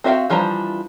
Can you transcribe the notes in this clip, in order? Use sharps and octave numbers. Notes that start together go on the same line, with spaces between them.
C4 F#4 E5 F5 G5
E3 F3 G3 D4 A#5